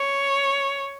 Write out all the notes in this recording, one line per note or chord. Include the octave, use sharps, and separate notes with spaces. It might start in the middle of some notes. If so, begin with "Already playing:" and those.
Already playing: C#5